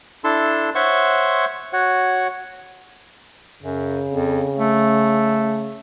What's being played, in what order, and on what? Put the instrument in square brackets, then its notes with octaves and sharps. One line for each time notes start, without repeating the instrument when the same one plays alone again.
[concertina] D4 E4 A4 A5 C6
C5 C#5 E5 F#5 C6 C#6
F#4 C#5 F#5
[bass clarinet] F#2 [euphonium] C#3
[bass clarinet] F2
A3